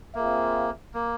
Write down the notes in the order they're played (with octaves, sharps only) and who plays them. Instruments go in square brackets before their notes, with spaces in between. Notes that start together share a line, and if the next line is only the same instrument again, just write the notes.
[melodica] A#3 [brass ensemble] C4 F4 G#4 E5
[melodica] A#3